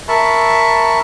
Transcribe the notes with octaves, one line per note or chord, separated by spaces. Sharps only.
A#4 E5 A5 B5 C#6